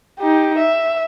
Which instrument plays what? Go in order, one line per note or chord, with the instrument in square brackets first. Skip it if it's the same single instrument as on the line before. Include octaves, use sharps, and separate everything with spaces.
[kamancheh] D#4 G4
E5